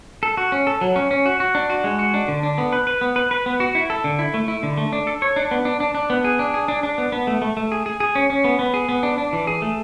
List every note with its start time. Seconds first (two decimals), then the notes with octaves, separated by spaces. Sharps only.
0.23 A4
0.37 F#4
0.52 C#4
0.67 A4
0.81 F#3
0.96 C#4
1.11 C#4
1.26 F#4
1.40 F#4
1.55 D4
1.70 F#4
1.84 G#3
1.99 F#4
2.14 D4
2.28 D3
2.43 D4
2.58 B3
2.73 B4
2.87 B4
3.01 B3
3.16 B4
3.31 B4
3.46 B3
3.60 F#4
3.75 E4
3.90 A4
4.04 D3
4.19 E4
4.34 A3
4.48 E4
4.63 D3
4.78 A3
4.93 D4
5.07 A4
5.22 C#5
5.36 D4
5.51 B3
5.65 D4
5.80 D4
5.95 D4
6.10 B3
6.24 G#4
6.39 D4
6.54 G#4
6.68 D4
6.83 D4
6.98 B3
7.12 B3
7.27 A3
7.42 A3
7.57 A3
7.72 G#4
7.86 G#4
8.00 G#4
8.15 C#4
8.30 C#4
8.44 B3
8.59 B3
8.74 G#4
8.89 B3
9.03 D4
9.18 D4
9.33 E3
9.47 G#4
9.62 A3